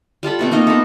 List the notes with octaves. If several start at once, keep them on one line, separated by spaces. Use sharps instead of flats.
G3 F4 A4 B5
B2 A3 C4
A#3 D#4 D#5 F5
A3 B3